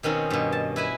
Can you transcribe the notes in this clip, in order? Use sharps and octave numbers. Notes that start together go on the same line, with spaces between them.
B2 D#3 C4 C#4 D#4
G2 B2
A5
E4 B4 E5 G#5